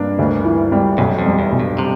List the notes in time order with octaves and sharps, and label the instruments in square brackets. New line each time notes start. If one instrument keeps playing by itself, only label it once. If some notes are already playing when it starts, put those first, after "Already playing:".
Already playing: [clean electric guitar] G2 [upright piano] A#3 D4
[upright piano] D2
E3
G3
[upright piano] B1 [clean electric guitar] F#2
[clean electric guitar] F2
[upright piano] G3
[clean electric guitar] E2
[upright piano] B1
[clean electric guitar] G2
C3